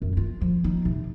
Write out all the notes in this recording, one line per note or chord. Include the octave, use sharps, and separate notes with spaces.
F#2
F4
F3
D#4
C3